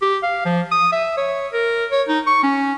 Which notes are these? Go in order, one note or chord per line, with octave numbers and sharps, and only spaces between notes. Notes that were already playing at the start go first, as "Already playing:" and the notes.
G4
F5
F3
D#6
E5
C#5
A#4
C#5
D#4
C#6
C#4